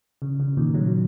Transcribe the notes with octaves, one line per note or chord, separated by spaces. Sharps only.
C#3
C#3
A#2 D#3
C#3 F#3